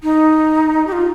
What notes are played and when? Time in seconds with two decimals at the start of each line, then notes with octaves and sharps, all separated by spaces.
0.03 D#4
0.87 G4
0.92 F4